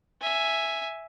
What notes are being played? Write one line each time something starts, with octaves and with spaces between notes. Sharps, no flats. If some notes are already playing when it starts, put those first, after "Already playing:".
E5 G#5